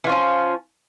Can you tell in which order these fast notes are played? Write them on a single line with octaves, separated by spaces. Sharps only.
E3 F4 C#4 F3